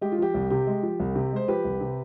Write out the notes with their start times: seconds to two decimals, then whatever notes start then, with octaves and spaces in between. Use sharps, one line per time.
0.01 G#3 G4
0.12 F4
0.18 F3 G4
0.34 C2
0.50 C3 G4
0.67 G#3
0.83 F3
1.00 C2
1.15 C3
1.32 G#3 C5
1.48 F3 G4 B4
1.65 C2
1.81 C3